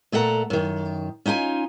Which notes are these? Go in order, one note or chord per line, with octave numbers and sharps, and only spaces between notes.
A#2 A3 A4 F#5 A#5
F#2 D#3
C#4 D#4 F4 G5 G#5